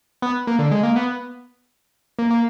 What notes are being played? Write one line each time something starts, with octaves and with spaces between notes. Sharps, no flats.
B3
A#3
D3
G#3
A#3
B3
A#3
A#3